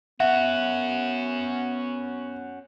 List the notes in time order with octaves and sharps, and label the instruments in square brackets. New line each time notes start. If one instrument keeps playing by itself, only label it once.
[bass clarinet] B3 [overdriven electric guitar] C#4 F#4 [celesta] E5 [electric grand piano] F#5